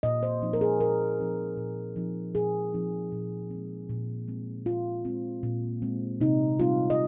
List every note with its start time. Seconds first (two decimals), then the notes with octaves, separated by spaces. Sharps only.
0.03 A#2 D#5
0.23 C5
0.42 F3 C4 D#4
0.53 A#4
0.61 G#4
0.80 A#2 A#4
1.19 F3 C4 D#4
1.57 A#2
1.96 F3 C4 D#4
2.35 A#2 G#4
2.73 F3 C4 D#4
3.12 A#2
3.50 G#3 C4
3.89 A#2
4.28 G#3 C4
4.66 A#2 F4
5.05 G#3 C4
5.43 A#2
5.82 G#3 C4
6.21 C3 D#4
6.60 G3 C4 D#4 F4
6.90 D#5